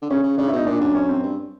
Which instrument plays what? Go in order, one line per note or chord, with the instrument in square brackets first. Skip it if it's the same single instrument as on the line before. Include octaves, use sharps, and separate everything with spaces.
[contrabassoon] D3
[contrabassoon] C#3 [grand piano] C#4
[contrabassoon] C#3
[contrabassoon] C#3 [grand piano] D4
[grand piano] E4
[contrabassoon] B2 [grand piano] D#4
[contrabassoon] A#2 [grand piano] D4
[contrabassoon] F#2 [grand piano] D4
[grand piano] C#4
C4
[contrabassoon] G2